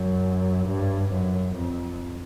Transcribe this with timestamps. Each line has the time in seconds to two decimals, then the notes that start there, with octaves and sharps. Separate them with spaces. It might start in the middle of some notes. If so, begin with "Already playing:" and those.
Already playing: F#2
0.67 G2
1.11 F#2
1.55 F2